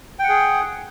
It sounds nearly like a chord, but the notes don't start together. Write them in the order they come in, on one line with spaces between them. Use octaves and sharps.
G5 F#5 G#4